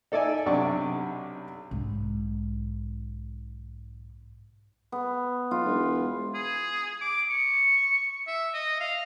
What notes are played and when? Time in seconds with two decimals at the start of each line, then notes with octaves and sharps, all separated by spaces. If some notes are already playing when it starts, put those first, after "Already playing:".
0.12 D#4 A4 D5 E5 G#5
0.46 B1 C3 D4 D5 G#5 C#6
1.71 B1 G#2
4.92 B3
5.51 B1 F4
5.65 E1
6.34 G#4
7.01 D6
7.30 C#6
8.27 E5
8.54 D#5
8.80 F5